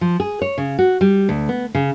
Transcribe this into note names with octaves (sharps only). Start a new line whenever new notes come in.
F3
G#4
C#5
C#3
F#4
G3
D2
B3
C#3